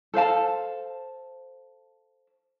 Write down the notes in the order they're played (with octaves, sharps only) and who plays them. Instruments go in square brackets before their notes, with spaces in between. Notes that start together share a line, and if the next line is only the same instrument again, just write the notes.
[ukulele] A4 C5 F5 A5